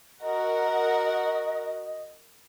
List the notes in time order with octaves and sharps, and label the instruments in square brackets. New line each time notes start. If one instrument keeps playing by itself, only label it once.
[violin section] F#4 A#4 F#5 [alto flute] D#5